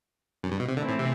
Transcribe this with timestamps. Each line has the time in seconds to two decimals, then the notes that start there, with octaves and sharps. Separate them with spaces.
0.43 F#2
0.52 G2
0.60 B2
0.68 C3
0.77 D3 E3 A3 C4 E4
0.88 A2
0.99 C3